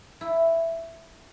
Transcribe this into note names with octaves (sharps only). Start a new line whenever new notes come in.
E4